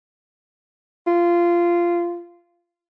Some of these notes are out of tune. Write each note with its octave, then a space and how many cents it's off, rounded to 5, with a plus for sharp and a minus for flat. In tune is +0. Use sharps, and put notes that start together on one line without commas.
F4 -15